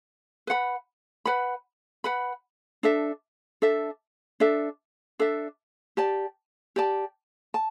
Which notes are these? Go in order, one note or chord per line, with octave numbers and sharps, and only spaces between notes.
B4 F#5 B5
B4 F#5 B5
B4 F#5 B5
D4 A4 E5
D4 A4 E5
D4 A4 E5
D4 A4 E5
G4 D5 A5
G4 D5 A5
A5